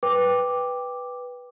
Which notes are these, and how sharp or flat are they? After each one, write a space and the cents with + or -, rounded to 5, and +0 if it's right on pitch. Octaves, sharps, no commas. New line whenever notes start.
B4 +0 G5 +10 D6 +0